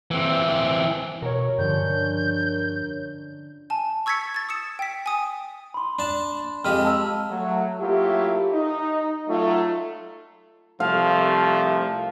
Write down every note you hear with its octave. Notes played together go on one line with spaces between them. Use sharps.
E3 C4
B2 A#4 C#5
G2 D3 F3 C#4 G6
G#5 A5
C#6 E6 G#6 A6 B6 C#7
G#6 A6
D#6 E6 C#7 E7
G5 B6
G#5 D#6
B5 C6
D4 A5
F2 G#3 G4 F6
A5 A#5 E6
F#3 A3
F#3 A3 A#3 E4 F4 G4
D#4
F#3 A3 D#4 F4
C2 F3 A3 F5